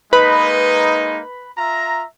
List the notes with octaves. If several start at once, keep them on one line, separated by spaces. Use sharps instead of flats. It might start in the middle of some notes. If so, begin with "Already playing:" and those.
G#3 A#3 D#4 B4 B5
F4 E5 A#5